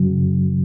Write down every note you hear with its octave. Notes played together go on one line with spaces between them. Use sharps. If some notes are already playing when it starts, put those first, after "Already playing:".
Already playing: F#2 C#3 F#3